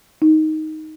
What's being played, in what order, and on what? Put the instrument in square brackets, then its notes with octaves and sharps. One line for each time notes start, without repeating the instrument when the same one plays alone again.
[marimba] D#4